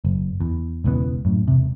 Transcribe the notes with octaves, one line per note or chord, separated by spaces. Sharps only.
F#1
E2
E1 C#2 E3 B3
F#2 A2
E1 C3